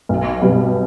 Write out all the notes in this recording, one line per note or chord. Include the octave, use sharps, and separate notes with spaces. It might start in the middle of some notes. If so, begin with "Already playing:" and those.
B1
B2 G3 B3